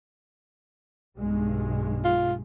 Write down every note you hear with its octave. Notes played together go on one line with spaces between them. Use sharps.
B1 G2 G#3
F4